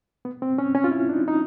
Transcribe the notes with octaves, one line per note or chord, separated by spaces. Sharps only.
B3
C4
C#4
C#4
F4
E4
D4
D#4
D#4